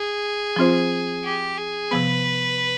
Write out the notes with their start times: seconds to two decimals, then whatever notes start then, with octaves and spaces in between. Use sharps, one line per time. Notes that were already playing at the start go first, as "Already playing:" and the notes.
Already playing: G#4
0.56 F3 C4 F4 C5
1.24 G4
1.58 G#4
1.91 C3 F3 B3 B4